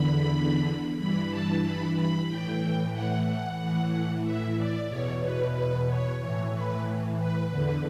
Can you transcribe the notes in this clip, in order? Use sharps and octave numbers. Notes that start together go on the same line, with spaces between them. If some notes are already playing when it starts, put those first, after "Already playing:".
Already playing: E2 D3 B5
G2 E3 B5
A5
B5
B5
A2 E3 G5
F#5
F#5
A2 E3 F#5
E5
D5
E2 B2 C#5
B4
B4
C#5
A2 E3 C#5
B4
B4
E2 D3 B4